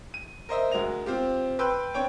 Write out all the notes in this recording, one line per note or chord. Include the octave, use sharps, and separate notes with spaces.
D#7
A#4 C5 D#5 E5
D2 G#3 F#4 A#4 D#5 F7
C4 F4 G4
B4 G5 C6 E6 F#6 G6
C4 D4 C#5 G5 D7